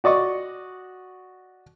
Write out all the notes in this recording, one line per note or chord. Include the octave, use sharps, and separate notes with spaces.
F#4 D5 D#5 C#6